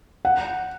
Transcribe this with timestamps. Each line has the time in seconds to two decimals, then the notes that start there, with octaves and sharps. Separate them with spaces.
0.25 F#5